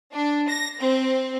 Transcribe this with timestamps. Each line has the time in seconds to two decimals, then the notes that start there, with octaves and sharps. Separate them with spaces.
0.13 D4
0.49 A#6
0.79 C4